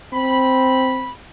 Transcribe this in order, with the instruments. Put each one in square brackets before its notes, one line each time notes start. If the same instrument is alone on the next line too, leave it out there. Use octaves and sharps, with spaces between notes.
[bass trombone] C4 [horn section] B5